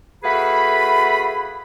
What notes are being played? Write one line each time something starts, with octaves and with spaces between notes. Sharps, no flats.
A3 F#4 G#4 B4 F5 B5